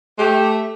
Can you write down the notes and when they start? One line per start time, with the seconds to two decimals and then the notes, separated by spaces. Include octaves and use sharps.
0.18 A3 G4